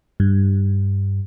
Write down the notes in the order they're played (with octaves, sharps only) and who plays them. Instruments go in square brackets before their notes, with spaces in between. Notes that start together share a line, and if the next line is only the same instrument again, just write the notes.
[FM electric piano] G2